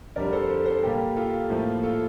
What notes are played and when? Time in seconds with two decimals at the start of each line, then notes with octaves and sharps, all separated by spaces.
0.16 F2 D3 G3 A#4 D5
0.32 A4 C5
0.49 A4 C5
0.65 A4 C5
0.83 A#2 G3 A#3 G4 A#4
1.16 F4 A4
1.50 A2 F3 A#3
1.83 F4 A4